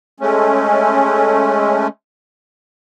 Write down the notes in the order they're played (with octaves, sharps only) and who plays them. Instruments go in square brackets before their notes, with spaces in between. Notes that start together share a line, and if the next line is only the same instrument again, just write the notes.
[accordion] G#3 A3 C#4